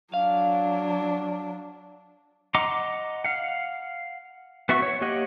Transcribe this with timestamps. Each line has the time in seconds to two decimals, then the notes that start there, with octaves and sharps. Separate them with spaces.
0.14 F#3 D4 F5
2.55 D#5 F#5 A#5 C6 D6
3.24 F5 F#5
4.69 B3 F#4 E5 C#6
4.82 C#5
5.01 A#3 G4 C#5 D#5 F#5